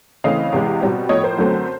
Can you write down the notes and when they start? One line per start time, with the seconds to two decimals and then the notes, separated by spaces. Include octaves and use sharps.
0.24 C#3 E3 A3 C4 D#5 F5
0.52 E2 C3 E3 G#3
0.81 B2 G3 C4
1.09 A2 F3 A3 C#5 D#5
1.24 A#4 C5
1.38 F#2 D3 F#3 A3 C4